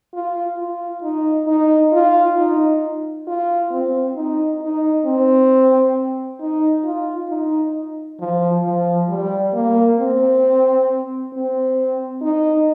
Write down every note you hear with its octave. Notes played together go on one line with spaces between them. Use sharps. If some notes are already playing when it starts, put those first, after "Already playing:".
F4
F4
D#4
D#4
F4
D#4
F4
C4
D#4
D#4
C4
D#4
F4
D#4
F3
F3
G3
A#3
C4
C4
D#4